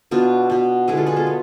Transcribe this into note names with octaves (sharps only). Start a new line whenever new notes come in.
B2 B3 D4 F4
B2 B3
D3 G#3 B3 E4 G#4
F4 A4
G#4 B4
F4 A4
B3